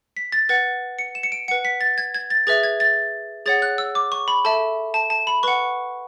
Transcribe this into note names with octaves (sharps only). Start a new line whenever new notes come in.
B6
A6
B4 F#5 A6
C#7
E7
C#7
D7
B4 F#5 C#7
B6
A6
G#6
G#6
A6
G#4 B4 E5 A6
G#6
A6
G#4 C#5 F#5 A6
F#6
E6
D6
C#6
B5
A4 E5 A5
A5
A5
B5
B4 F#5 C#6